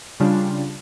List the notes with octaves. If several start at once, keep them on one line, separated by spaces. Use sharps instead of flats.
C#3 G3 D4 F4